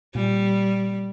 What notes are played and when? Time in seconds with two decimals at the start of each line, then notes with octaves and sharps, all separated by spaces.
0.15 A#2 G3